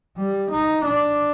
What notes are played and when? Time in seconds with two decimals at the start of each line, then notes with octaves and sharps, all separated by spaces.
0.17 G3
0.52 D#4
0.86 D4